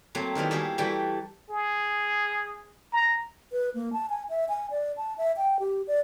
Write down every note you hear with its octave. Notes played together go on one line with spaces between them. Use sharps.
F#3 A3 A#3 C4
D#3 E3 G3 B3 D#4
G3 A#3 E4 F#4 G#4
E3 G3 A3 F#4 G5 B5
G#4
A#5
B4
A#3
A5
G#5
E5
G#5
D5
A5
E5
G5
G4
D5